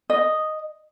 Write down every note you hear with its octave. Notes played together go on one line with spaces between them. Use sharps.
D#5